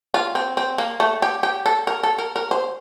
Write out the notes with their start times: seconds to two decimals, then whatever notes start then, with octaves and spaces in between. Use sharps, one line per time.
0.14 F4
0.35 C4
0.57 C4
0.78 A#3
1.00 A3
1.22 G4
1.43 G4
1.66 A4
1.87 A#4
2.03 A4
2.18 A#4
2.36 A#4
2.51 C5